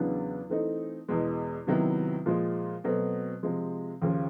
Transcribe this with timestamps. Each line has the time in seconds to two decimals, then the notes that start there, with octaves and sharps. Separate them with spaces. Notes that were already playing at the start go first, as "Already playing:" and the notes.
Already playing: E2 C#3 F#3 B3 D4
0.50 E3 A3 C4 D#4
1.09 E2 B2 G#3
1.67 C3 D#3 F#3 B3 E4
2.26 A#2 F3 G#3
2.84 B2 F#3 A3 C4
3.43 C3 F3 G#3
4.02 D#2 C#3 F3